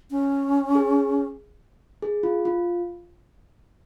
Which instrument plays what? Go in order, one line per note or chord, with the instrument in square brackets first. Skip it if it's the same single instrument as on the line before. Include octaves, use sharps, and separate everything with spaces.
[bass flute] C#4
[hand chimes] G#4
G#4
F4
F4